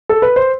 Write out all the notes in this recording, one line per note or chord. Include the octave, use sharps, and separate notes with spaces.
A4
B4
C5